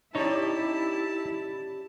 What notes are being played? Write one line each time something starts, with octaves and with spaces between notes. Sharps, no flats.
C#4 D#4 E4 G4 C#5 D5 A5